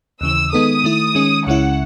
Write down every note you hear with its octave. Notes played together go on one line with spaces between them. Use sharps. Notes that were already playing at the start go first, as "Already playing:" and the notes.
D#2 C#3 E3 E6
D#3 G#3 B3 D#4 A4 D#6
D#3 A3 E4
D#3 G#3 C#4
C#2 C#3 G#3 C#4 E4 F#5